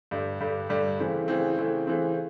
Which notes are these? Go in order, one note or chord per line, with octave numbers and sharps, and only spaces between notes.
G2 D3 G3
G2 D3 G3
G2 D3 G3
C#3 E3 A3 C4
C#3 E3 A3 C4
C#3 E3 A3 C4
C#3 E3 A3 C4